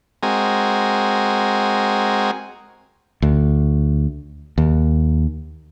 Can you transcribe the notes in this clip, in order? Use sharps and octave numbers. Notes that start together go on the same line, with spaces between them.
G#3 C4 F#4 A#4 G#5
D2
D#2